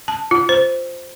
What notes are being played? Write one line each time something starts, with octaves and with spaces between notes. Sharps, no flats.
A5
F4
C5